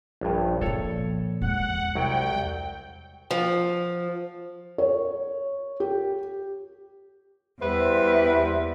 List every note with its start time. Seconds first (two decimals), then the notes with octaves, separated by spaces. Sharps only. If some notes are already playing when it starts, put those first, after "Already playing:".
0.21 A#1 G2
0.61 A#2 F3 A4 C#5
1.41 E2 G#3 F#5
1.95 C2 F#3 G5
3.31 F3
4.78 C#5
5.80 G4
7.62 E2 G3 B4 C5 E5